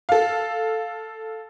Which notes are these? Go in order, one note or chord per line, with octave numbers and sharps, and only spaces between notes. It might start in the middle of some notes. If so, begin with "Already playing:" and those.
A4 F5